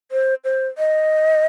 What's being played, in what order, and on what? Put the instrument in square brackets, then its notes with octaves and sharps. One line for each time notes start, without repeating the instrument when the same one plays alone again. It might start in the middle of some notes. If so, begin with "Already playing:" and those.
[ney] C5
C5
D#5